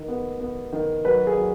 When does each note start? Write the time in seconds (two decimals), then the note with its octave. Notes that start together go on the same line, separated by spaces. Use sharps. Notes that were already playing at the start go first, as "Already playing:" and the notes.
Already playing: D#3
0.08 B3
0.40 B3
0.73 D#3
1.04 F#3 B4
1.27 G#4
1.38 F#3